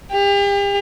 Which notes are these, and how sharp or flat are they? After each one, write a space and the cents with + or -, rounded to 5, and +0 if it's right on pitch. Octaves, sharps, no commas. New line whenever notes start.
G4 +40